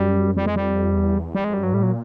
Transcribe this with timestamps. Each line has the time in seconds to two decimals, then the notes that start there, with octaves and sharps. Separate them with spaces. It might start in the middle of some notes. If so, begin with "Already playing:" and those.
Already playing: F#2 G3
0.36 F2 G3
0.46 G#3
0.56 G3
0.95 E2
1.35 G3
1.39 E2
1.44 F2 G#3
1.53 F#2 G3
1.63 G2 F#3
1.73 A2 G3
1.83 A#2 F#3